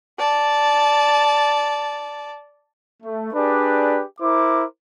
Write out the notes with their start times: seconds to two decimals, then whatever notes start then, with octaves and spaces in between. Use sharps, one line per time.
0.19 D5 A5
3.03 A3
3.34 D4 G4 G#4 B4 D5
4.20 E4 A#4 C5 D6